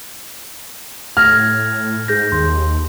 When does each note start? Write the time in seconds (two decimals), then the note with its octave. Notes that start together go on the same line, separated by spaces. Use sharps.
1.17 A2 F6 G#6 A#6
2.08 G#2 G#4 G6 A#6
2.32 D#2 C6